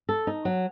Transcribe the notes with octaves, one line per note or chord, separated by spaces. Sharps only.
A4
D#4
F#3